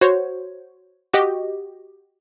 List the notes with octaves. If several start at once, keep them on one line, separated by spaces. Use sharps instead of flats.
F#4 C5 C#5
F#4 G4 D#5